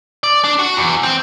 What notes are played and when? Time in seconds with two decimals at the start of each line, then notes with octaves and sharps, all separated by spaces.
0.23 D5
0.44 D4
0.59 F#4
0.77 E2
1.03 C4